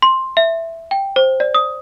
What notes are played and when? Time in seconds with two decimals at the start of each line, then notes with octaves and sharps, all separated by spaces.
0.02 C6
0.37 E5
0.91 G5
1.16 C5
1.40 D5
1.55 D#6